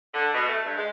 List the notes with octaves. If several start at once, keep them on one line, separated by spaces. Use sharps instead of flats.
D3
B2
A3
G2
G#3